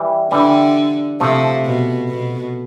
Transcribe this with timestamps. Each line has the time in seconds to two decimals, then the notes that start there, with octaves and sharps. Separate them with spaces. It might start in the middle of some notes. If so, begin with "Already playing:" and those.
Already playing: E3 G3
0.31 D3 E3 G3
1.20 C3 F3 A3
1.64 B2
2.09 B2